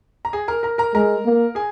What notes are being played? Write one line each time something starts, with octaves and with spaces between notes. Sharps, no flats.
A#5
G#4 G#5
A#4 A#5
A#4 A#5
A#4 A#5
G#3 A#4 A#5
A#3
G#4 G#5